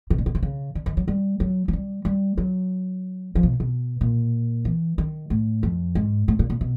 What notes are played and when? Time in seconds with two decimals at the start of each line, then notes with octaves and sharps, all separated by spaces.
0.10 B2
0.18 A#2
0.26 B2
0.35 C3
0.43 C#3
0.75 D3
0.86 D#3
0.97 F#3
1.08 G3
1.40 F#3
1.68 F#3
1.73 G3
2.05 G3
2.38 F#3
3.35 F3
3.43 B2
3.60 B2
4.01 A#2
4.65 E3
4.98 D#3
5.30 A2
5.63 F2
5.95 G#2
6.28 A2
6.39 A#2
6.50 A#2
6.61 B2